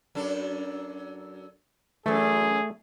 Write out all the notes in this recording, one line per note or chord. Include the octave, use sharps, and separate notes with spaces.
F#2 D4 A4
F#2 E3 A3 G#4